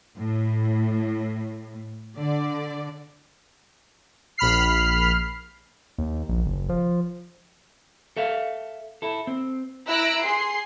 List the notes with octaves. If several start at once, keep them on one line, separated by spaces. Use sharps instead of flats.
A2
D3 D5
A#1 B5 F6 C7
D#2
A#1
F#1
F3
A4 E5 F5
E4 A4
C4
E4 A#5 E6 F#6 A#6 D7
G#4 C6 C7